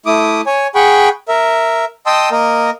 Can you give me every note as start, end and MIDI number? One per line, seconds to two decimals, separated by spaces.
0.06 0.41 57
0.06 0.41 64
0.06 0.41 86
0.06 0.41 87
0.46 0.67 73
0.46 0.67 80
0.75 1.09 68
0.75 1.09 78
0.75 1.09 79
0.75 1.09 83
0.75 1.09 85
1.28 1.85 70
1.28 1.85 76
2.06 2.29 75
2.06 2.29 79
2.06 2.29 81
2.06 2.29 84
2.06 2.29 87
2.06 2.29 88
2.31 2.70 58
2.31 2.70 70
2.31 2.70 75